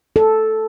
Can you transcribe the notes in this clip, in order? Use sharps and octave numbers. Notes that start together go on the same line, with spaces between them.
A4